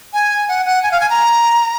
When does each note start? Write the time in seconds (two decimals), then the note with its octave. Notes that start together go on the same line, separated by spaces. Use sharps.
0.13 G#5
0.49 F#5
0.66 F#5
0.83 G#5
0.92 F5
1.01 G#5
1.10 A#5